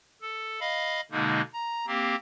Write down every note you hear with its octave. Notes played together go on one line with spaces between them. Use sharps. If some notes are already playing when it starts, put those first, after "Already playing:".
A4
D#5 F5 B5
B2 D3 G#3 A#3 D#4
A#5
A#3 C4 G4